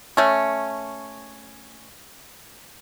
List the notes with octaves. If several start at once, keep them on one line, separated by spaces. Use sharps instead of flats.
A3 C#4